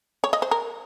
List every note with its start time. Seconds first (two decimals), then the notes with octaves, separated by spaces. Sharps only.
0.24 C#5
0.33 D#5
0.42 C5
0.51 A#4